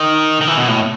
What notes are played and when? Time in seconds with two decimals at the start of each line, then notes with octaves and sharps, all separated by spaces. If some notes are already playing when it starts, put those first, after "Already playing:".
Already playing: D#3
0.41 D#3
0.48 E3
0.57 B2
0.68 A2